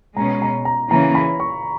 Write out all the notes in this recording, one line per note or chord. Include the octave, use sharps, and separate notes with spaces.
B2 G#3 C#4 A#5
A#5
A#5
C#3 E3 A#3 C#4 A#5
B5
C#6